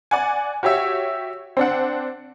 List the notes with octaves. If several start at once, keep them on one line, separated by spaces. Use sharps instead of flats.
D5 F#5 G#5
F#4 G4 C#5 E5
C4 D4 F#5